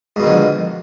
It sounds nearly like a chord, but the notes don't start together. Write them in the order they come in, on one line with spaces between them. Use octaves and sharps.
G#2 B2 D#3 D3 F2